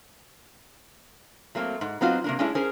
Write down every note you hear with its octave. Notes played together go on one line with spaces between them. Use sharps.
F#3 A3 A#3 C4
G#2
F#3 B3 C4 D#4 F4 F#4
C3 A#3 D4
G#3 A3 C#4 D4 E4
C#4 G#4 A#4 C5